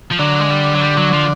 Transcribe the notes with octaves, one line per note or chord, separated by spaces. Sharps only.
F3
D3 F#3
G#3
G3
F#3
G3
F#3
F3